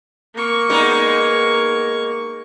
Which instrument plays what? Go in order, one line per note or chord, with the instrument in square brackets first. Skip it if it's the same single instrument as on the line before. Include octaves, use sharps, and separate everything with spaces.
[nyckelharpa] A#3 C#6
[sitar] G#3 B3 D#4